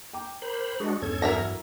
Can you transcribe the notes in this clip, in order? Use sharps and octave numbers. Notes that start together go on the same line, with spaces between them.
G5 A#5 D6
A#4 C5 B5
G#3 D4 F#4 G#4
E2 G2 C#4 A4 G#6
E3 F#3 A#4 E5 A#5